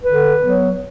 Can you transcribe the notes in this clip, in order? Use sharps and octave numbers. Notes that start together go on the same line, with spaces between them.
D3 B4
F#3 B3